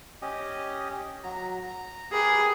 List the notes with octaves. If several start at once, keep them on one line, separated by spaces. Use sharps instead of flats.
C#4 G4 D#5
F#3 A#5
A#5
G4 G#4 A#4 B4